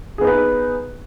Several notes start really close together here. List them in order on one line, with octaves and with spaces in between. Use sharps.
G#4 B3 D#4 B4